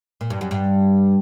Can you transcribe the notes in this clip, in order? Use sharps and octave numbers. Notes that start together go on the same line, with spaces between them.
A#2
G2
F#2
G2